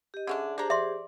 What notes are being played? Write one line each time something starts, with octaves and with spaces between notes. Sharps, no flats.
G4 D#5
D3 C#4 D4 G#4 E5
D4 G4 G#4 C5 A#5
D5 E5 C6